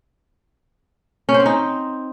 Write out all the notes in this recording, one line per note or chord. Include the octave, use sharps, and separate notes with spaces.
C#4
C5
C4
D#4